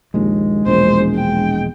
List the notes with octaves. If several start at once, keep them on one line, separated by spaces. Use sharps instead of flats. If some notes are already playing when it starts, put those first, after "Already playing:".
A#1 D#2 G#3
E1 A#1 C5
G5